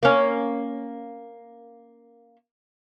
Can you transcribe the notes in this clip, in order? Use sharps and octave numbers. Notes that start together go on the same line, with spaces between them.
A#3 C#4